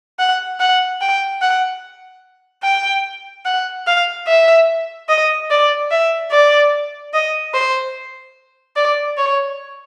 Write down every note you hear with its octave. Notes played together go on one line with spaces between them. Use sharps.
F#5
F#5
G5
F#5
G5
F#5
F5
E5
D#5
D5
E5
D5
D#5
C5
D5
C#5